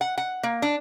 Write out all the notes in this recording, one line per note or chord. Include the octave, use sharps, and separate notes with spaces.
F#5
F#5
A#3
D4